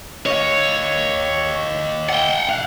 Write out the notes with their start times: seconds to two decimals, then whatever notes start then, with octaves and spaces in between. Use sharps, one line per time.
0.26 C#5 D#5 F5
2.09 F#5 G5
2.49 F5 F#5